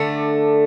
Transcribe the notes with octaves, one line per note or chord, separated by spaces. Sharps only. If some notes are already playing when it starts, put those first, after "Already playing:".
Already playing: D3 A3 D4